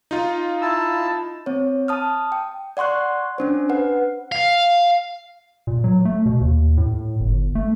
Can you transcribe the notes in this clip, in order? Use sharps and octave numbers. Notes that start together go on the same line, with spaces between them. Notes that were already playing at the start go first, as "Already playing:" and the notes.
D#4 F4
E4 A5 E6
C4 C#5
A5 D#6 F6
G5
D5 F#5 C6 C#6 F#6
C#4 D4 C5
B4 F#5
F5
A#2
F#3
A3
B2
D#2
A2
G1
A3